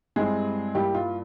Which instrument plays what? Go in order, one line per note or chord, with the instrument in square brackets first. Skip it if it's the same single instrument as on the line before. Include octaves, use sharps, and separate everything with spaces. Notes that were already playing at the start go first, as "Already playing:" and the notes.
[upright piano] G2 G3 G#3 C4 E4 G#4
G2 G3 A#3 E4 G4
F4